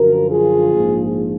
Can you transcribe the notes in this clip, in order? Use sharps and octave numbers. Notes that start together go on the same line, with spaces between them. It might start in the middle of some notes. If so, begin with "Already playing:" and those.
Already playing: F#2 D3 F3 F#4 A#4
F4 G#4
A#1 G#2 F3 A#3